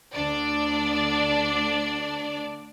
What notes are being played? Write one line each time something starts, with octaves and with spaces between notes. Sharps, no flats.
D2 D4 D5